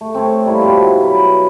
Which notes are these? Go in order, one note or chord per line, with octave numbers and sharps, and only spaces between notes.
A3
C4 A4 C#5
G3 A#3 E4 C#5
B2 F3 F4 G4
E4
F#3 B4